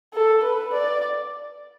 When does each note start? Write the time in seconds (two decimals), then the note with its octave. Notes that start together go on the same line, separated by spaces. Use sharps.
0.14 A4
0.43 B4
0.73 D5